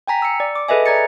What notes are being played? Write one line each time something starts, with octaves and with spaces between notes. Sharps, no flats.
G5 G#5 A#5 B6
E6 C#7
D5
D6
G#4 A4 B4 D#5 E5 G#5
D5 A#5 G#6 A6 C#7